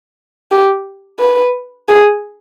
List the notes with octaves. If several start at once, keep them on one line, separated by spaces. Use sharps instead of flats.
G4
B4
G#4